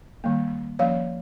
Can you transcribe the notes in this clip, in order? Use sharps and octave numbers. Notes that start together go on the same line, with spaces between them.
D#3 G3 A#3
F3 A#3 C#4 C#5 F5